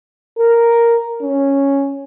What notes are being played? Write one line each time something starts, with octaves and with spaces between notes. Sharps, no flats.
A#4
C#4